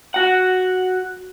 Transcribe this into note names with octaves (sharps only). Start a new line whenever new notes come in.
F#4 F#5